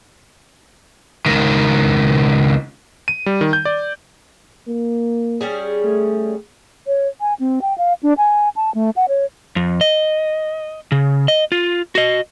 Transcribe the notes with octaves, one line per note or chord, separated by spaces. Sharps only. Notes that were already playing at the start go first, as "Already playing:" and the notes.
C#2 D#3
D#7
G3
D#3
G6
D5
A#3
G3 C#4 G#4
A3
C#5
G#5
C4
G5
F5
D4
G#5
A5
A3
F#5
C#5
F2
D#5
C#3
D#5
F4
F#4 D#5